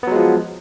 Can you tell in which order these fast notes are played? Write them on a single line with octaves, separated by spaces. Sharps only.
B3 F#3 G#3 F3